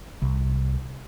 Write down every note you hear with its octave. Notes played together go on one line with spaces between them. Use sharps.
C2